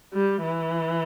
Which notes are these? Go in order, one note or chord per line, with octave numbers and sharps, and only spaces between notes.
G3
E3